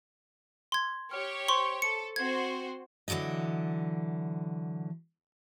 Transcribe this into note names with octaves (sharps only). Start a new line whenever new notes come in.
C6 G#6
G4 C#5 F6
C5 C6 C#6
A4 C#7
C4 F#4 C5 G#6
D3 E3 F#3 D5 D#5